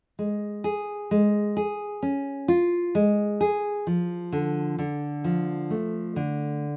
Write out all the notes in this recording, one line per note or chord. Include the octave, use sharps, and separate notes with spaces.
G#3
G#4
G#3
G#4
C#4
F4
G#3
G#4
F3
D3
D3
F3
A3
D3